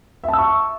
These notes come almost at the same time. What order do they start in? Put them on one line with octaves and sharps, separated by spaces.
E5 A5 E6 C#6